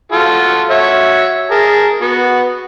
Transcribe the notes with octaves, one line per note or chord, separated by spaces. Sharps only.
F4 F#4 A4
F#4 C#5 E5
G#4 A#4 A5
B3 F#4